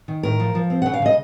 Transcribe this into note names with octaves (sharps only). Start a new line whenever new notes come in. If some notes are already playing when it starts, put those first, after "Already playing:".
D#3
A2 A#4
F3
F3
C4
F#5
C#3
F5
C#3 D#5